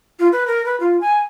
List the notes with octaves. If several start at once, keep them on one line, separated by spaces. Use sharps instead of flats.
F4
B4
A#4
B4
F4
G#5